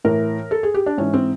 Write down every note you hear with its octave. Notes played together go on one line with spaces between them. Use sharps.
A2 E3 A#4
A4
G#4
G4
D4
G#2 E3 C#4
C4